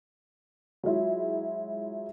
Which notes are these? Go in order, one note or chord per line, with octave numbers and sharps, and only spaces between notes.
F#3 G#3 E4 F4